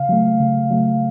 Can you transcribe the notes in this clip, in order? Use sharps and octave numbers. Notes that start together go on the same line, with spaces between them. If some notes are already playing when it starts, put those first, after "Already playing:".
Already playing: C#3 F5
F#3 A3
C#3
F#3 A3